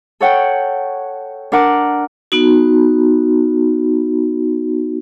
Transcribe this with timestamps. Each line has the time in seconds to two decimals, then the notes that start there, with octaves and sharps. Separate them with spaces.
0.20 A4 C#5 F#5 G5
1.52 D4 A#4 F#5 D6
2.32 B3 D#4 F#4